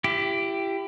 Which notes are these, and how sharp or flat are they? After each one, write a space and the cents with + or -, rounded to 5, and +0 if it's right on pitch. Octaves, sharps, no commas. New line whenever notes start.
E4 +30 G4 +0